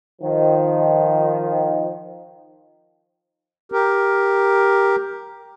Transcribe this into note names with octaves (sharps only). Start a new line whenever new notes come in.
D#3 F3
G4 A#4